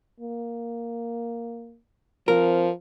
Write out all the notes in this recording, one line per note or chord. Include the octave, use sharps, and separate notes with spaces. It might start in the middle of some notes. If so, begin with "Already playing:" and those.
A#3
F3 C4 A#4